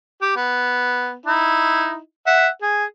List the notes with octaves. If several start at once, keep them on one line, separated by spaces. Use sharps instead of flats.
G4
B3
D#4 E4
E5 F#5
G#4